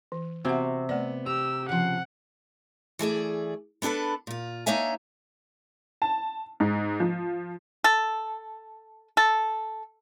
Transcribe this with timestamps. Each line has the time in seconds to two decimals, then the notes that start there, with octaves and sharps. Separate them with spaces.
0.12 E3
0.45 C3 B3 F#4 C5 F#5
0.89 A3 B3 D5
1.26 G4 A#5 E6
1.69 C#3 F3 F#5
2.99 E3 A3 G#4 D5
3.82 B3 D4 G4 A4 B4
4.27 A#2 F4
4.66 A#3 D4 D#4 C#5 E5 G#5
6.02 A5
6.60 G#2
7.00 F3
7.84 A4
9.17 A4